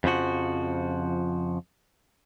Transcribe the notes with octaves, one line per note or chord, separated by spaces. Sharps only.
F2 C#3 F3 F#4